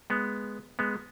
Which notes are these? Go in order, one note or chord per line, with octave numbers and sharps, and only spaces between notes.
G#3 B3
G#3 B3